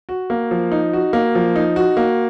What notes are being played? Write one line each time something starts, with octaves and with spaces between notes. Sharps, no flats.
F#4
A#3
F3
D#4
F#4
A#3
F3
D#4
F#4
A#3